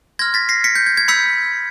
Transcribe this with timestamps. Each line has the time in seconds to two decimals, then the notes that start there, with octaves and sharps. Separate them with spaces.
0.19 C6 F6 G#6 A#6
0.34 A6 B6
0.49 A#6 C7
0.64 B6 C#7
0.75 G6
0.86 G#6
0.97 G#6
1.08 B5 E6 G6 B6 C#7